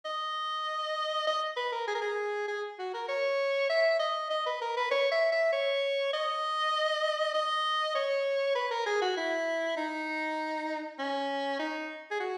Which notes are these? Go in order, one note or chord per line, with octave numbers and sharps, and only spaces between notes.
D#5
D#5
B4
A#4
G#4
A#4
G#4
G#4
F#4
A#4
C#5
E5
D#5
D#5
B4
A#4
B4
C#5
E5
E5
C#5
D#5
D#5
C#5
B4
A#4
G#4
F#4
E4
D#4
C#4
D#4
G#4
F#4